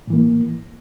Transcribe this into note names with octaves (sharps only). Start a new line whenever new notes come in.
A2 E3 A#3